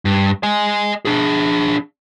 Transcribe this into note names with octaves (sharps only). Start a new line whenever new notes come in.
G2
D#5 G#5
D4 G#4